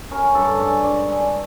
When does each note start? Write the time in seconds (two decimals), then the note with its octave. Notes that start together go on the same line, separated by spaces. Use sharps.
0.11 C#4 A#4
0.35 G2 A4
0.59 G#3 D5
0.83 G2 D5
1.08 G#3
1.20 D5